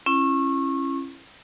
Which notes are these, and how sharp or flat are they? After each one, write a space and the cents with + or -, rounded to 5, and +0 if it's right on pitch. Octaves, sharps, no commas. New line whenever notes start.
C#4 -25 E4 +30